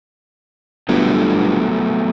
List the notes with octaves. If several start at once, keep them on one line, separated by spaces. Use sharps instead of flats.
G1 F#3 A3 B3